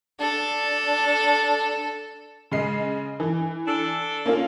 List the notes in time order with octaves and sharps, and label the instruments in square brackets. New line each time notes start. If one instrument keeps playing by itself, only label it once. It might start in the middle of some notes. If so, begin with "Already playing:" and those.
[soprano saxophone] D4 [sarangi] A4
[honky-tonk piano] C#3 G#3 C7
E3
[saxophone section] D4 A4
[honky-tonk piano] A#3 C#4 F4